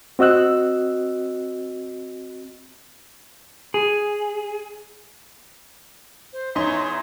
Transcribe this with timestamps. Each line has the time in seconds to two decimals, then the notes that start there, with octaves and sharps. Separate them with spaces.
0.19 C4 F#4 D#5 E6 F#6
3.74 G#4
6.33 C5
6.55 E2 D#4 C#5 C6